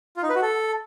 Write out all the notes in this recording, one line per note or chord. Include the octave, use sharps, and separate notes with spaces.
F4
D#4
B4
F#4
A4